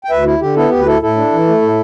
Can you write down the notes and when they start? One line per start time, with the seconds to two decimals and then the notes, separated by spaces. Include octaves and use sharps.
0.04 G5
0.10 D2 B4 E5
0.25 E4
0.41 D3 G4
0.56 B3 E4 A4
0.71 D2 G4
0.80 B4
0.86 E4 A4
1.02 A2 E4 A4
1.16 D4
1.32 E3
1.47 A3
1.62 A2